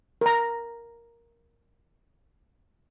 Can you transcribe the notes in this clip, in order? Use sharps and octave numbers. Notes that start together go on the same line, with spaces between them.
A#4 A#5